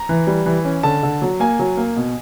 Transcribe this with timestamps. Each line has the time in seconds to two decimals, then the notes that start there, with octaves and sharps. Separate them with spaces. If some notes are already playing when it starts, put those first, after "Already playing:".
Already playing: A#5
0.09 E3
0.27 G3
0.46 E3
0.65 C#4
0.83 D3 A5
1.03 D3
1.22 F#3
1.40 A#3 G#5
1.59 F#3
1.77 A#3
1.96 B2